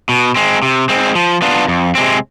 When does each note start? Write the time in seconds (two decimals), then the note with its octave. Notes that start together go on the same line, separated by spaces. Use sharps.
0.09 B2
0.36 G#3 C4
0.63 C3
0.89 G#3 C4
1.15 F3
1.42 B3 D4 F4
1.68 F2
1.95 C3 G#3 C4